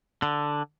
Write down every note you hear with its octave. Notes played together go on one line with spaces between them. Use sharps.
D3